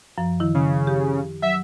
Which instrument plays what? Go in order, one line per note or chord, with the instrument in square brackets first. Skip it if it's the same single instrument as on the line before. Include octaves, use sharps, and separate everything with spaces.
[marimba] F#2 F3
D#3 E4
[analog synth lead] C#3
[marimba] G4
[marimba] F#3 [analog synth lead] E5